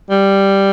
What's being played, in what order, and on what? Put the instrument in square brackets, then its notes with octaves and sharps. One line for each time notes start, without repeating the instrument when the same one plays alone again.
[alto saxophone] G3